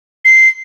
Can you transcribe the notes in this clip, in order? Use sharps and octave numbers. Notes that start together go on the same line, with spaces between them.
C7